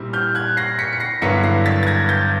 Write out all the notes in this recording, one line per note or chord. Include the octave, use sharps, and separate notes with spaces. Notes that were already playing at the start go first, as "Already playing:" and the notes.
Already playing: A#2 G3 C4 E4
F6 G6
F#6 G#6
A#6 C7
B6 C#7
C#7
A#6 C7
G2 D3 F#3 B3 E4 B6 C#7
A#6 C7
A6 B6
A6
G#6 A#6
G6 A6